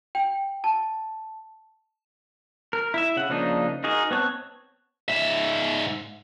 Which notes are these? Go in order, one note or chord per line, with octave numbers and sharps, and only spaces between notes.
G5
A5
A#4
E4 E5
C#3 F#5
C#3 F3 A#3 D4 D#4
D#4 F#4 G#4 A#4
B3 C4 C#5 A5 F#6
G#2 E5